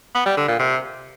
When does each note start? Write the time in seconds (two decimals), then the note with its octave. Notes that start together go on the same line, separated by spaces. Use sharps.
0.15 B3
0.26 G3
0.37 D3
0.48 A#2
0.59 C3